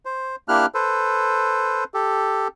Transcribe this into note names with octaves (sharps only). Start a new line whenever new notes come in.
C5
A#3 D4 E4 G4 F6 F#6
A4 B4 C5
G4 A4